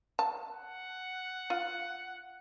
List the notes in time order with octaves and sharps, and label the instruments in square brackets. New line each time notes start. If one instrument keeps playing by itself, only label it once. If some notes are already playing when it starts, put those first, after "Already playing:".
[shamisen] A5
[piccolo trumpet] F#5
[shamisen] F4